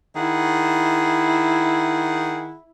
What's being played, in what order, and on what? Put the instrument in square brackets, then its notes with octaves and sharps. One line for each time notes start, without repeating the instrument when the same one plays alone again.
[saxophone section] D#3 G#4 F#5 [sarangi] E4